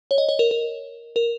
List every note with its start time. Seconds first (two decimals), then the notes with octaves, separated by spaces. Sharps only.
0.11 C#5
0.18 D#5
0.29 C#5
0.39 A#4
0.51 A#4
1.16 A#4